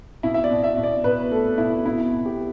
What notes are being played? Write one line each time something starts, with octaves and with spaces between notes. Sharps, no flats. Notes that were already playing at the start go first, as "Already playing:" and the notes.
B2 E4
E5
D5
B2
E5
B2
D5
B2 B4
A3 A4
B2 E4
B3 E4
B2
G4